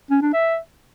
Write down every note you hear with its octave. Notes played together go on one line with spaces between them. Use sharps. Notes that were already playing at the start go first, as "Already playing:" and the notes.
C#4
D4
E5